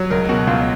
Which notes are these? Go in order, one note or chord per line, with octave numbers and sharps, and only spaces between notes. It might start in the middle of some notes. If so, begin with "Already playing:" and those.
Already playing: F#3
C#2 A#4
B2 F#4
C#2 F4